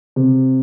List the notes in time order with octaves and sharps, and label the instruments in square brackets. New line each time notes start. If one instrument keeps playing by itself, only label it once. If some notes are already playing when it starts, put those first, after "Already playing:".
[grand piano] C3